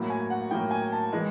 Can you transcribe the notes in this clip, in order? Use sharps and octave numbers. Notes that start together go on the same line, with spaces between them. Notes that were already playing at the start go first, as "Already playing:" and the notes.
Already playing: A2 F#3 A#3
G#5
F#5
A2 F#3 A#3 G5
G#5
A5
E3 G#3